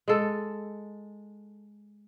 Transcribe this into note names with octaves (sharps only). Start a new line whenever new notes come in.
G#3 A4